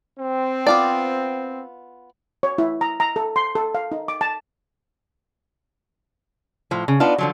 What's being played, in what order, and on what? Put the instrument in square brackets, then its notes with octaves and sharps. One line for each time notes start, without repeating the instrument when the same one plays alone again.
[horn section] C4
[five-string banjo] B3 F4 D5
[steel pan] C#5
E4
A#5
A#5
A4
C6
A4
F5
D#4
D6
A5
[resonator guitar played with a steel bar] A2 F3
C#3
B3 D4 D#4 F4
D3 F3 F#3